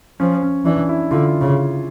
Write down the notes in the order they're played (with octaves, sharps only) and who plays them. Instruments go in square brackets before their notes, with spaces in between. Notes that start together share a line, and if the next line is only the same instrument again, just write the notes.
[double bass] F3 [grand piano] C#4
[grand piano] C#4
[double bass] E3 [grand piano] D4
[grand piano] E4
[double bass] D3 [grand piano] F4
[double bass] C#3